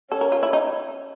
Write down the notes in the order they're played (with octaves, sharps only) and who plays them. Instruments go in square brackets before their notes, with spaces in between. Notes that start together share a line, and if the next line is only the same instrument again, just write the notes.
[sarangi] C#4 [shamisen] A4
[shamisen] A#4
F4
E4
D#4